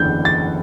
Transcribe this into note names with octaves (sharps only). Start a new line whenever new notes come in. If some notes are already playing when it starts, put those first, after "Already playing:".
Already playing: F#1 E2 D3 G6
A6